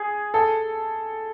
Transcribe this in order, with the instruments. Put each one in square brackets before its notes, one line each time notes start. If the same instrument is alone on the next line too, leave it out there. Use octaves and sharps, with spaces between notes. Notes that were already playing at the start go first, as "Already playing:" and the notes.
Already playing: [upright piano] G#4
A4